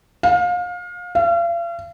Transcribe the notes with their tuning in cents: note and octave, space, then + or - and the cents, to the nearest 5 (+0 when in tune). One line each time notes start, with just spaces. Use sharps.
F5 +30
F5 -40